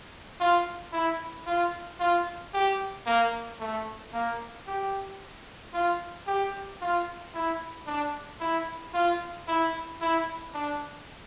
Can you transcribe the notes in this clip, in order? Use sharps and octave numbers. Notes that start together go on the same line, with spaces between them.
F4
E4
F4
F4
G4
A#3
A3
A#3
G4
F4
G4
F4
E4
D4
E4
F4
E4
E4
D4